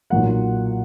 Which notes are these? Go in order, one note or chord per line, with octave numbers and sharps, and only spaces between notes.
B1 A#2 F#3 A#3 F#5